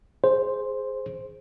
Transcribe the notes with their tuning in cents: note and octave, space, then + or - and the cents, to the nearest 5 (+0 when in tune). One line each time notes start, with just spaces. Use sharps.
G#4 +0 C5 +0